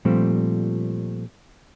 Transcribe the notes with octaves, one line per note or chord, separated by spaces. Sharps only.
A#2 F3 G3 A3 C4